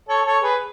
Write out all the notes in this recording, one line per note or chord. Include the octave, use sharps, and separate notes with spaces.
A4 C#5
A4 C#5
G#4 B4